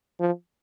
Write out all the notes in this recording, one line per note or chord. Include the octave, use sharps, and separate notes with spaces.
F3